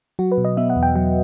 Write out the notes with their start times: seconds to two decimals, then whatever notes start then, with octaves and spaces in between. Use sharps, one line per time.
0.19 F#3 F#4
0.32 B4
0.38 B2
0.45 D#5
0.57 B3 E5
0.70 F#5
0.76 E2
0.83 G5
0.95 F#3 G5